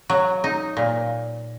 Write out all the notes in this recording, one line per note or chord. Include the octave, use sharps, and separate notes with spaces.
F#3
D#4
A#2